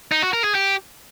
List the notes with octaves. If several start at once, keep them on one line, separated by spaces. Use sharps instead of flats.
D#4
F#4
A#4
G#4
G4